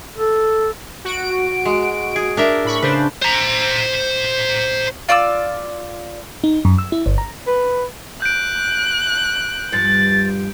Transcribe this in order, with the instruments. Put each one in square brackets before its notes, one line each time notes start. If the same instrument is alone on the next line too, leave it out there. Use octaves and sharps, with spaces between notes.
[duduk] A4
[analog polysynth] F#4 D7
[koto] G#3
G#4
D4 A#4 E5
[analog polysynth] A2 B5 C#6
[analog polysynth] C#3 D4 C5 [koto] B4
[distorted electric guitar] C5 A#5
[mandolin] F4 D5 D6 E6
[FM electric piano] D#4
F#2
E6
E4
G1
A#5
[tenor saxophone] B4
[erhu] F#6 [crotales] G6 D7
[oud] G2 F3 [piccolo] A6